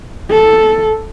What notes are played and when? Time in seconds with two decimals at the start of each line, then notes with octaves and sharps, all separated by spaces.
0.31 A4